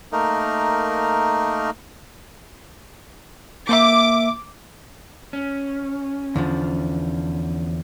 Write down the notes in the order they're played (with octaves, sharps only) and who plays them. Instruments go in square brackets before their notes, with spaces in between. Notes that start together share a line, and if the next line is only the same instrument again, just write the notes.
[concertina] A3 A#3 D#4 A#4
[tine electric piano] A#3 E5 [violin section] D6
[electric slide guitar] C#4
[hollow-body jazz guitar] E2 D3 F3